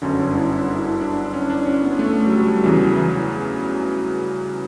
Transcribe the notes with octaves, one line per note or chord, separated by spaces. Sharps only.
G1 F#2 D3 C#4
D4
E4
E4
E4
D4
C#4
D4
C#4
B3
A3
F#3
G3
E2 C#3 E3 F#3
E3